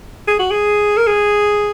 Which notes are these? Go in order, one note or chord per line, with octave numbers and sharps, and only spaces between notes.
G#4
F#4
G#4
A#4
G#4